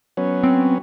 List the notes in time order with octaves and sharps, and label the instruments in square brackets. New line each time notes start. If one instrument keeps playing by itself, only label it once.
[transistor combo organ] F#3 B3 C#4
[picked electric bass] C4